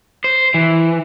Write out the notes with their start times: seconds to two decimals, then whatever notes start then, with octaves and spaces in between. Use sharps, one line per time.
0.24 C5
0.54 E3